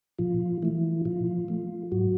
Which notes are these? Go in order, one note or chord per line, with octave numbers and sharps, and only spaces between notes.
A#2 F3 F4
E3 F3 A3 E4
A#2 F3 F4
F3 A3
G#2 F#3 F#4